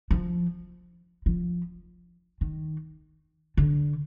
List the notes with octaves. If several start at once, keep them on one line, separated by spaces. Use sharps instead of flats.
F3
F3
D#3
D3